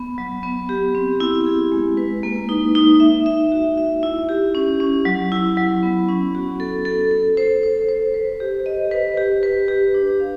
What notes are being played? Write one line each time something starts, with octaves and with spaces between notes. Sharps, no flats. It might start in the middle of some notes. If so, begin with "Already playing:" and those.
Already playing: B3
F#3
B3
G4
C4
E4
G#4
G#3
B4
A#3
D#4
D#4
E5
E5
F#4
E5
E4
G4
C#4
C#4
F#3
E4
F#3
B3
C#4
F#4
A4
A4
A4
C5
C5
C5
B4
G4
D#5
B4
G4
B4
G4
D4
F5